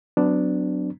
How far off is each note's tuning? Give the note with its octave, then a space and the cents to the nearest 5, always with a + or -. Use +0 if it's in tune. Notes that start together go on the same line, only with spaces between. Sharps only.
F#3 +0 B3 +35 D4 +0